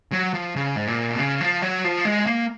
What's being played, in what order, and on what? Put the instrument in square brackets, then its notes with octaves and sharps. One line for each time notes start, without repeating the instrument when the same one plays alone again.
[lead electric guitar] F#3
F3
C#3
G#2
A#2
B2
C#3
F3
F#3
F3
G#3
A#3